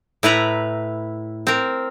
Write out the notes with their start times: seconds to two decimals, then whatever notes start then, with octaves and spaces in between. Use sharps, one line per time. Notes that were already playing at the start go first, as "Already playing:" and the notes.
0.23 A2 E4 B4 A#5
1.47 C4 A#4